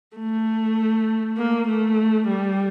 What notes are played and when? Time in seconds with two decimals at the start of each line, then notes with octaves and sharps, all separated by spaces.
0.17 A3
1.37 A#3
1.68 A3
2.28 G3